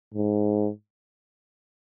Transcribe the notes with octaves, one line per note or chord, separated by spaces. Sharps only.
G#2